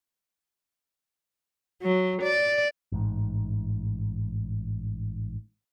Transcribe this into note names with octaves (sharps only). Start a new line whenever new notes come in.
F#3
D5
A1 G#2